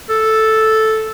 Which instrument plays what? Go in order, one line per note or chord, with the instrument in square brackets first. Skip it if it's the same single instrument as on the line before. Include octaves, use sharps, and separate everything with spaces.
[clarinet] A4